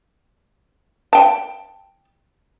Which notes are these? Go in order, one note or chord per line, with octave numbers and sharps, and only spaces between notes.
G5 A5